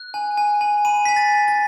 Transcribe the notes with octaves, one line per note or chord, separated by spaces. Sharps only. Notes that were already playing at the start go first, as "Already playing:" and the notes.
Already playing: F#6
G#5
G#5
G#5
B5 D#7
G#5 B6
A6
G#5
A6